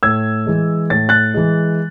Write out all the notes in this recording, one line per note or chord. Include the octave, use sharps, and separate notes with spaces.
A2 E6 G#6
E3 G#3
A2 A6
F#6 A6
E3 G#3